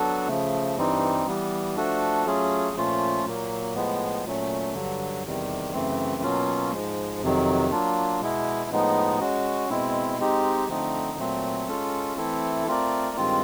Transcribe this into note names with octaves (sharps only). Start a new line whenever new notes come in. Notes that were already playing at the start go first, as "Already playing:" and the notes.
Already playing: F#3 B3 D4 F#4 A4
C#3 F3 A3
G2 E3 G3 C4 D#4
E3 G3 B3
F3 A3 D4 F#4 A4
F#3 A3 C#4 F4 G#4
A#2 F3 A3 C#4 F4
A#2 F#3 A#3
A2 F3 G#3 B3
A#2 F#3 A3 C#4
G2 D3 F#3
E2 C3 D#3 G3
F#2 C#3 E3 A3 C4
B2 F#3 A#3 C#4 F4
G#2 F3 G#3
F2 C3 D#3 F#3
F#3 A#3 D4 F4
B2 G#3 B3 E4
A2 F3 G#3 B3 D#4
G#3 C#4 F#4
B2 G#3 C4 E4
G#3 C4 D#4 G4
D3 F3 A3 C4 D#4
A#2 F#3 A3 C4
G#3 C#4 F4 A4
E3 A3 C4 E4 A4
A3 C4 F4 A#4 D5
G2 D#3 G#3 C4 F4